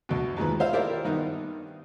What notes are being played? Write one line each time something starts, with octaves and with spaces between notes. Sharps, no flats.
D2 B2
D#2 D#3 F3 G#3 B4
F4 C5 E5 F5
E4 G4 A#4 C5 D5 E5
G2 D#3 B3 D#4